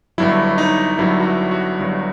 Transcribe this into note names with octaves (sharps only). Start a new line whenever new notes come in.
G1 G2 F#3 E4
D#4
G1 G2 F#3 E4
F#4
E4
F#4
G1 G2 F#3